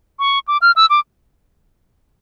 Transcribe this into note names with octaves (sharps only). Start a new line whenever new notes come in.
C#6
D6
F6
E6
D6